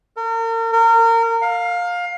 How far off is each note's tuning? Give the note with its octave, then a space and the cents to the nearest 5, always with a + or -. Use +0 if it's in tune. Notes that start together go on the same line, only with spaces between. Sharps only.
A#4 -40
A#4 -30
F5 +20